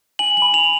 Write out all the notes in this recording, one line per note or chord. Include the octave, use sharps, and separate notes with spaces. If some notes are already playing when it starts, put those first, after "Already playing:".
G#5 F#7
B5 F#7
F7